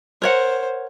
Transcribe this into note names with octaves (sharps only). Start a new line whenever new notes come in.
A#4 C5 C#5 F#5